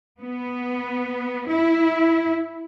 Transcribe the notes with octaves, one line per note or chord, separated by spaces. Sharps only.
B3
E4